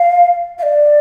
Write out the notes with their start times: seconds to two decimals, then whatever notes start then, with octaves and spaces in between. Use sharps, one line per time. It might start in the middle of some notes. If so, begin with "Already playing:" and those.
Already playing: F5
0.58 F5
0.63 D5